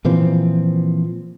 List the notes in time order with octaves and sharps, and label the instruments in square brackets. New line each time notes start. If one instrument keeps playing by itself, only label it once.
[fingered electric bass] A#2 E3 F3 C4